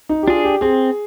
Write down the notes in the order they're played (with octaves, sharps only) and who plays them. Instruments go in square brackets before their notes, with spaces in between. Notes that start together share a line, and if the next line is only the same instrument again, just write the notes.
[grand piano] D#4
G4
[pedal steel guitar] D4 G#4 [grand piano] F4
[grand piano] G4
[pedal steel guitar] C4 [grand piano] G#4